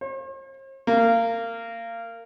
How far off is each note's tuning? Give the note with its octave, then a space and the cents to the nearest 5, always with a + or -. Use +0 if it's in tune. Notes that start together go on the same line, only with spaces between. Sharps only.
C5 +45
A#3 -25